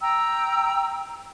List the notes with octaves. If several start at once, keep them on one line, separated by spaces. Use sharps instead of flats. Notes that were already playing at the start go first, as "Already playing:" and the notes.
G5 A#5 E6